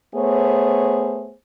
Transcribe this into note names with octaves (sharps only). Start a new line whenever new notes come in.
A3 B3 G#4 C5 C#5